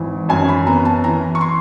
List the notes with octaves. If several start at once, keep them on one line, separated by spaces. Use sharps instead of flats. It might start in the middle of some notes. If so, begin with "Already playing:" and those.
Already playing: G#1 E3
F#2 G#5
B5
B3 A#5
A5
E3 A#5
C#6
C6